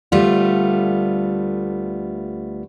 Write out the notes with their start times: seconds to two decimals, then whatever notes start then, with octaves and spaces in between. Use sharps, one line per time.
0.12 D2 G3 A3 B3 F4